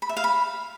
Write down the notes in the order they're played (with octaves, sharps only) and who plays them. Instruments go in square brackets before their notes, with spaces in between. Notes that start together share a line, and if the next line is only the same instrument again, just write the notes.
[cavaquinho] B5
E5
F5
B5